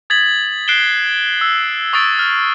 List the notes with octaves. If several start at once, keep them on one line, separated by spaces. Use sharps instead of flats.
D#6 G#6 A6 B6 F#7
F#6 C7 D7 E7 G7
E6
C#6 D#6 E6 A6 D7
F6